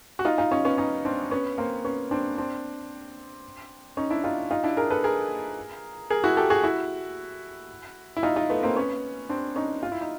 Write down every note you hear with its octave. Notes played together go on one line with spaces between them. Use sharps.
F#4
D#4 F4
D#4 F4
C#4 D#4
B3 C#4
C#4 D#4
C4 D4
B3 C#4
A#3 C4
B3 C#4
C4 D4
C4 D4
C#4 D#4
D4 E4
D#4 F4
D#4 F4
D4 E4
G#4 A#4
A4 B4
G#4 A#4
G#4 A#4
E4 F#4
G4 A4
F#4 G#4
E4 F#4
E4
D#4 F4
D#4 F4
A3 B3
A#3 C4
B3 C#4
C4 D4
C#4 D#4
F4
E4
D#4